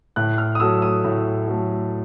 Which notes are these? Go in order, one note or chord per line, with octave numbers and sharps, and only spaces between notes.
A2 F#6
F6
D#6
F#3 A3 E6
D#6
A2
F#3 A3